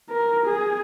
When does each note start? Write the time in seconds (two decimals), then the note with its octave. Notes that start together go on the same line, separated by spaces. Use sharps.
0.10 A#4
0.46 G#4